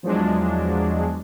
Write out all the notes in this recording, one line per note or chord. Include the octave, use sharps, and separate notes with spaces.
E2 F3 F#3 G#3 D4